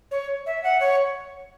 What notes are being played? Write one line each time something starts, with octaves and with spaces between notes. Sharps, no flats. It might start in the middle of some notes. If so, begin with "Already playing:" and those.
C#5
E5
F#5
C#5